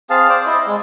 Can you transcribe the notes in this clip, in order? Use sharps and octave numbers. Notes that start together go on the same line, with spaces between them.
C4 G#4 F5 A5
C5 D5 D6
E4 D#5
G#3